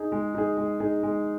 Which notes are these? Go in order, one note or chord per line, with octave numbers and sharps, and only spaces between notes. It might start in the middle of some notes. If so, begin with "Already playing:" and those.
Already playing: D#4 G#4
G#3
D#4 G#4
G#3
D#4 G#4
G#3